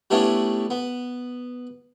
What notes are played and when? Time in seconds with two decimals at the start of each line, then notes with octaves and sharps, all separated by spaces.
0.11 G3 A3 B3 C#4 D4 E4
0.70 B3